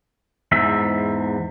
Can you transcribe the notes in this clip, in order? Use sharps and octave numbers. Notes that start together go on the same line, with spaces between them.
E2 G#2 E5